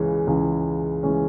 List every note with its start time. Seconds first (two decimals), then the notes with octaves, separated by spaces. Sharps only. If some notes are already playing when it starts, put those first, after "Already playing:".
Already playing: C#2 C#3 E3 G#3 C#4
0.27 C#2 C#3 E3 G#3 C#4
1.03 C#3 E3 G#3 C#4